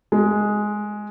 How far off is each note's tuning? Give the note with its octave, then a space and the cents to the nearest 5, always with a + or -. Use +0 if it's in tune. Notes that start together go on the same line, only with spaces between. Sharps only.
G#3 +5